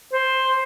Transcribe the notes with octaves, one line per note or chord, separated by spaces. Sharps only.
C5